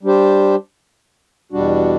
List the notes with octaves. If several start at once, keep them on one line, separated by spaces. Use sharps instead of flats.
G3 D4 G4 C5
E2 B2 G3 D4 F#4